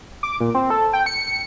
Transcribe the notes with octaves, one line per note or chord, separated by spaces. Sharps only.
D6
A#2
C4
A4
G5
C#7